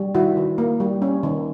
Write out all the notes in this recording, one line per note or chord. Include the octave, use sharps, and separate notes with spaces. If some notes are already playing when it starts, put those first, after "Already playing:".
Already playing: G3
D#3 E4 F#4
D#3
A#3
G3
C#4
D#3